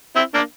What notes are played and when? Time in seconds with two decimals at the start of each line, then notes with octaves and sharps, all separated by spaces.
0.16 C4 E4
0.34 A#3 D4